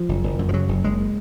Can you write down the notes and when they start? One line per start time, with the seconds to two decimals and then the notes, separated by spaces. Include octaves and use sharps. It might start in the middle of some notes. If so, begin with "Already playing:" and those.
Already playing: F3
0.09 F#1
0.23 F#1
0.39 F#2
0.49 F3
0.53 C#3 F#3
0.68 F#1
0.84 F#1 G#3